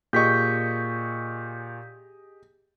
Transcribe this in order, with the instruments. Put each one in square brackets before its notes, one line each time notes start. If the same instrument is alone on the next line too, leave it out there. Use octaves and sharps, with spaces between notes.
[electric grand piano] A#2 C#6 [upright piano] G4 G#4 D#5 [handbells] G6 B6